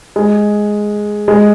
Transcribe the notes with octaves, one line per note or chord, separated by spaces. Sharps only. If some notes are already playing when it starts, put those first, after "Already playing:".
G#3
G#3